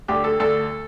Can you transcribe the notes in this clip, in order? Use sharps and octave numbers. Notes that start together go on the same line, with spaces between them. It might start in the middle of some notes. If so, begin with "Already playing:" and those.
D2 D3 G4
A4
D2 D3 A4